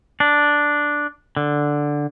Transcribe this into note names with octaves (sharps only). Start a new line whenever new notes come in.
D4
D3